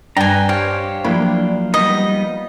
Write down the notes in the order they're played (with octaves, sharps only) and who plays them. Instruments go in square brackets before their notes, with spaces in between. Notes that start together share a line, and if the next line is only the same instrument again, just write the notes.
[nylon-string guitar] G2 [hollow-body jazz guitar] D4 [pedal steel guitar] B4 A#5 [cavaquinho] G5 G#5
[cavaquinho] G4 [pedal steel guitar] C5 C#5 F5
[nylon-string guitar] F3 A#3 [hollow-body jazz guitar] F#3 E4 B5 [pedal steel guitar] D4
[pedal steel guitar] G3 B3 D#4 [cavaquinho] D#5